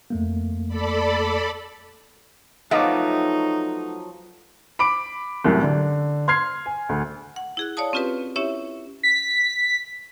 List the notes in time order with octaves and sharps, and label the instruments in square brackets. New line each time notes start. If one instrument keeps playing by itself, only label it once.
[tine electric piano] F2 A3 A#3
[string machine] A4 D5 B5
[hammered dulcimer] F3 F#3 [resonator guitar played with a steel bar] A3 B3 [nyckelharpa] D#4 [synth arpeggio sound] D#5 F5 D6
[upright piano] B5 D6 D7
C2 F#2 A2
D3
C6 F6 G#6 C7
G#5
D2
[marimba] F#5
E4 G#4 F#6
C#5 D5 F5 A5 D#6
C4 C#4 F4 G4 B4
C#4 E4 G4 C#5 E5
[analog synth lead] B6